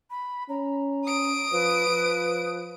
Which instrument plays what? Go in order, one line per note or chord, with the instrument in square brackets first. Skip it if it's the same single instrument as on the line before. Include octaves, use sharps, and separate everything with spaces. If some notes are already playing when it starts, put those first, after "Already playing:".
[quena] B5
[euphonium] C#4 [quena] A#5
[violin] D#6 D7
[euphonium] F3 [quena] B4
[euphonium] F3